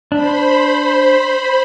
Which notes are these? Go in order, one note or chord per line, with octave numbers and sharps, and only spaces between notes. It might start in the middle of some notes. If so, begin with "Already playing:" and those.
D4 C5 B5